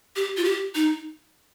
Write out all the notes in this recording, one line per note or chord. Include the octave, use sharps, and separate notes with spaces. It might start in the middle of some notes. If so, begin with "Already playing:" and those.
G4
F4
G4
D#4